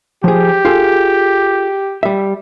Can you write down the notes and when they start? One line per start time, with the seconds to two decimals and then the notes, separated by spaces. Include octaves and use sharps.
0.24 F3 G4 G#4
0.65 F4 G#4 A4
2.03 G3 E5